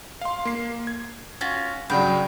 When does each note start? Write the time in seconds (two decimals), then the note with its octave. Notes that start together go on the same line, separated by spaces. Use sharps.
0.21 F5 C6
0.45 A#3 C7
0.87 G#6
1.41 C#4 F4 F#4
1.90 G2 C#3 F#3 D5 F#5 G5 B5